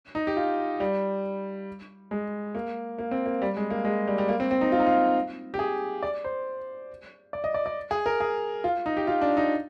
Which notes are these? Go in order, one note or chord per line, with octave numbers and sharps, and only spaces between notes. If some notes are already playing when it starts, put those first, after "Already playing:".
D#4
G4
F4
G3
G#3
A#3
A#3
C4
A#3
G3
G#3
A#3
G#3
G3
G3
A#3
C4
C4
D#4
F4
D#4
F4
G4
G#4
D5
C5
D5
D#5
D5
D5
G#4
A#4
G#4
F4
D#4
G4
F4
D4
D#4